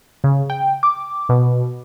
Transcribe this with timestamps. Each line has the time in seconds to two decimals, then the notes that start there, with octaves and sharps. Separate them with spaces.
0.24 C#3
0.50 G5
0.83 D6
1.29 B2